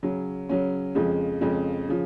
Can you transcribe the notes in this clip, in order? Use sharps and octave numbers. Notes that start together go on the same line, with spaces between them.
C#3 F#3 C#4
C#3 F#3 C#4
F2 C#3 F3 G#3
F2 C#3 F3 G#3
C#3 F3